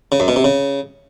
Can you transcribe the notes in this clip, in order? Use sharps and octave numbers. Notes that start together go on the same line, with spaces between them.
C#3
F#2
B2
C3
C#3